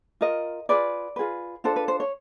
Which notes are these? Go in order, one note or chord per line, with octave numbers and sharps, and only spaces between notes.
F4 A#4 D#5
F4 G#4 B4 D5
F4 G#4 B4
D4 F4 A4 C5
B4
C5
C#5